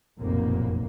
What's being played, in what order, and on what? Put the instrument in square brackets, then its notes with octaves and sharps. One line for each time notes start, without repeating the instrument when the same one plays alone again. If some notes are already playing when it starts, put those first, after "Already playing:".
[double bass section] F1 B1 F#2 A#2 A#3